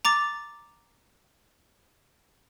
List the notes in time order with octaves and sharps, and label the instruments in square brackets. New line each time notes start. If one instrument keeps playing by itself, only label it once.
[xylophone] A#5 D6 A6